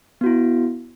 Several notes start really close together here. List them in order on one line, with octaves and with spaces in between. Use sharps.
B3 F#4 E4